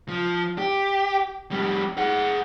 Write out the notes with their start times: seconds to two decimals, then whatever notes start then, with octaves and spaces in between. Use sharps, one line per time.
0.08 F3
0.58 G4
1.51 F2 G3
1.97 G#4 F#5